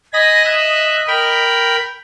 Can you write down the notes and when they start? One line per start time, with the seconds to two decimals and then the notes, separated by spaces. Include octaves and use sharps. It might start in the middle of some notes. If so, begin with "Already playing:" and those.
0.13 D#5 G#5 B5 A#6
0.45 E5 F#6
1.07 A#4 G5 B5